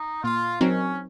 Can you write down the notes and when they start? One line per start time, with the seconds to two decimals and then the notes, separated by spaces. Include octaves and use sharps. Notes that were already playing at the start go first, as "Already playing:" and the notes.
Already playing: D#4
0.24 A#2 F4
0.61 F#3 C4 C#4 D#4 A#4